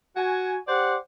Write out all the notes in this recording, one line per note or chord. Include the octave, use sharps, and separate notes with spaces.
F#4 G#5
G4 C5 D5 F#5